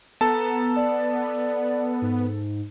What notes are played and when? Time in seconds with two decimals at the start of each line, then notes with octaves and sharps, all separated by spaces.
0.21 B3 A4 A5 A#5
0.76 D5
2.02 G#2